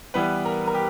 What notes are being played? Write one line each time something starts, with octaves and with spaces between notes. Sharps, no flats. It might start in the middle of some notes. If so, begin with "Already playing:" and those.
E3 G3 B3 B4
A#4
A#4
G4